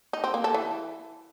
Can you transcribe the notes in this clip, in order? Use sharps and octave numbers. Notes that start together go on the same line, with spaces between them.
D#4
C4
A#3
A4
E3